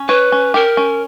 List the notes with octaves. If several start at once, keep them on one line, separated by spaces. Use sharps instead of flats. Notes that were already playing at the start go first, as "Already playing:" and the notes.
Already playing: C#4
B4 C#5
C#4
G4 A#4
C#4